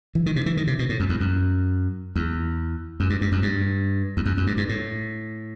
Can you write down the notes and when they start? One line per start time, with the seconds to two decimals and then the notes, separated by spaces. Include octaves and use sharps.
0.15 E3
0.26 D#3
0.36 C3
0.46 E3
0.57 D#3
0.67 C3
0.79 B2
0.89 A2
1.00 F#2
1.09 E2
1.20 F#2
2.16 E2
3.00 F#2
3.10 G2
3.21 G2
3.32 F#2
3.42 G2
4.17 E2
4.26 F#2
4.37 F#2
4.47 G2
4.57 G2
4.69 A2